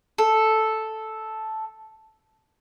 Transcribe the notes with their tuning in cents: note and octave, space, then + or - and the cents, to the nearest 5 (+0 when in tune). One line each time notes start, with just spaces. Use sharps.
A4 -5